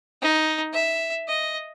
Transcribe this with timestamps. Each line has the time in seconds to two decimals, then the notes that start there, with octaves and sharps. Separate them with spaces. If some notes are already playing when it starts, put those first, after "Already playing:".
0.22 D#4
0.73 E5
1.28 D#5